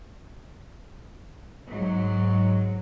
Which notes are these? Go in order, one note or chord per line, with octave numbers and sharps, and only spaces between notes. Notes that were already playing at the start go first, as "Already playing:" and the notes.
G#2 F#3